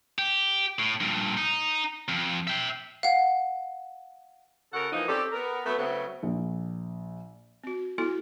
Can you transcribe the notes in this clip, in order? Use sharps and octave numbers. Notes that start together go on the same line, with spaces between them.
G4
A2
G2 A#2
D#4
F2
E5 G5
F5 F#5
C#3 F#4 A4 A#4 F#5
E3 F3 A#3 D#4
C4 C#4 G4 A4 D5
B3 A#4
F#3 A3 B3
C#3 F#3 A3 B3 C4
A#1
C4 F#4
B3 E4 F#4 A4